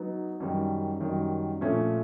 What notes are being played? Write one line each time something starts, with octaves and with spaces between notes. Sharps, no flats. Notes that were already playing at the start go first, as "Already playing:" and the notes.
Already playing: F#3 B3 D#4
F#2 D#3 G3
F#2 D#3 G3
A#2 F3 A3 C#4 F4